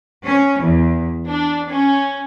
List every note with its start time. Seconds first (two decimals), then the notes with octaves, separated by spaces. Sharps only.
0.24 C#4
0.60 E2
1.26 D4
1.69 C#4